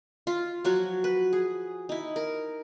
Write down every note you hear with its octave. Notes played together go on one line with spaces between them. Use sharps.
F4
F3 F#3 F#4 C#5
B4
G#4
D#4 E4
A#4